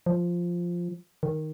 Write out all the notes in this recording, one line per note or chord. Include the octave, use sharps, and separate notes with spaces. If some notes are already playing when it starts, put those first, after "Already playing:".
F3
D#3